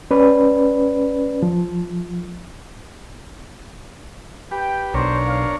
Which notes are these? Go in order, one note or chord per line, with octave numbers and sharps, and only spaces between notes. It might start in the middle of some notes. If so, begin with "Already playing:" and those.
C#4 B4 D5
F3
G4 B4 G5
B1 D4 A#4 C5 C#5
F5